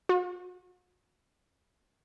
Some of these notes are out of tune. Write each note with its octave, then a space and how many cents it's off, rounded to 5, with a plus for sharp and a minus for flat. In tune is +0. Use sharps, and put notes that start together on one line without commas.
F#4 -45